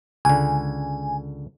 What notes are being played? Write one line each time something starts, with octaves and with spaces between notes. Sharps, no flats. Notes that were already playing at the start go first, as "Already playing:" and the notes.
C#2 D3 G#5